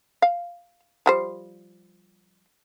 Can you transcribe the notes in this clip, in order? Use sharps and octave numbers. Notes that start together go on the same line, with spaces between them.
F5
F3 G3 C5